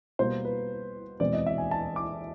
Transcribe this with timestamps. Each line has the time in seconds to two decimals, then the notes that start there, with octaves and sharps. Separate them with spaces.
0.19 B2 G3 A#3 C5
0.45 B4
1.20 E2 B2 G#3 C4 D5
1.33 D#5
1.47 E5
1.58 G#5
1.71 A5
1.96 D6